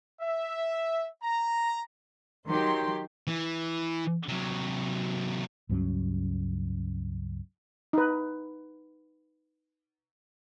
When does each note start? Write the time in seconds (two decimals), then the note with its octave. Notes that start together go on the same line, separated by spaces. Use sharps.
0.21 E5
1.23 A#5
2.48 D#3 F#3 G4 C6
3.27 E3
4.28 C3 F#3
5.69 C#2 G2 F#3 C#4
7.93 D#4 B4